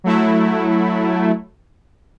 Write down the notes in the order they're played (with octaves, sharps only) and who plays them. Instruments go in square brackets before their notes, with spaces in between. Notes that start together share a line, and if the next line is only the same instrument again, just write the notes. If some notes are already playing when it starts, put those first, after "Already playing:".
[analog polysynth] F#3 A3 E4